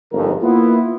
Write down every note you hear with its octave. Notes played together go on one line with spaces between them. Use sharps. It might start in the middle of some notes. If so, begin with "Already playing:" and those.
G1 F2 G#2 A#4
A#3 B3 E4 F4